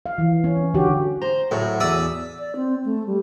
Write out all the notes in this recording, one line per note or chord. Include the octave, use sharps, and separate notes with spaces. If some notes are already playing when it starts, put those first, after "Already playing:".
F5
E3
C#4
D3 F#4 G4
C5 A#5
A2 F#3 A3 F#4 G#4
E2 D5 E5 D#6
D5
C4
A3
G3